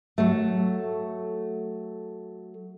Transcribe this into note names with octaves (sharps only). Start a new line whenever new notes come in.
F#3 A3